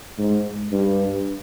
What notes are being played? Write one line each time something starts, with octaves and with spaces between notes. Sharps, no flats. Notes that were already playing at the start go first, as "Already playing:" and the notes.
G#2
G2